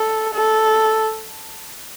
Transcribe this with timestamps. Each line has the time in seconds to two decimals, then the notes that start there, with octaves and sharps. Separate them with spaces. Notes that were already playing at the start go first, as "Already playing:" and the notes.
Already playing: A4
0.34 A4